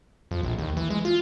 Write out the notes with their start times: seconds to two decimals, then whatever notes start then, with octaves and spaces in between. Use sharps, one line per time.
0.31 F2
0.43 A#1
0.59 D#2
0.77 E3
0.90 G#3
1.05 F4